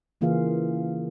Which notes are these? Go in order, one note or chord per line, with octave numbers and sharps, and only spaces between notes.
C#3 E3 A#3 F4 G#4 F5